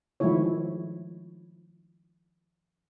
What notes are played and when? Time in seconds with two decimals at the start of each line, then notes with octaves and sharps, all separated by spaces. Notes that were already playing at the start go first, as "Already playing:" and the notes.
0.20 D#3 F3 G#3 A3 E4 C#5